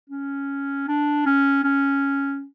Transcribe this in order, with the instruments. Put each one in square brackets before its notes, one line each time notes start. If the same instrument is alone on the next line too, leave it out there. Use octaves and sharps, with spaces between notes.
[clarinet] C#4
D4
C#4
C#4